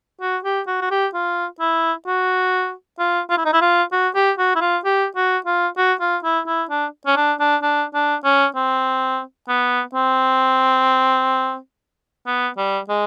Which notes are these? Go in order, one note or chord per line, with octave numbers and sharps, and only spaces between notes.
F#4
G4
F#4
F#4
G4
F4
E4
F#4
F4
F4
E4
D#4
E4
F4
F#4
G4
F#4
E4
F4
G4
F#4
F4
F#4
F4
E4
E4
D4
C#4
D4
D4
D4
D4
C#4
C4
B3
C4
B3
G3
G#3